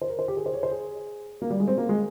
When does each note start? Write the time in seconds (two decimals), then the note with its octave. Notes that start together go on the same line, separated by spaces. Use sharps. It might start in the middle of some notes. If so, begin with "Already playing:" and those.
0.02 C5
0.10 A#4
0.19 C5
0.28 G4
0.37 G#4
0.46 C5
0.54 C#5
0.63 C5
0.71 G#4
1.42 A#3
1.50 G3
1.60 G#3
1.68 C4
1.78 A#3
1.89 G#3